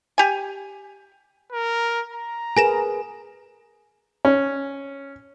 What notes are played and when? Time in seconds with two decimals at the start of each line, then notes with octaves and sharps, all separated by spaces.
0.18 G4 G#5
1.52 A#4
2.13 A#5
2.57 G#4 A#4 B4 G#5 A#6 E7
4.25 C#4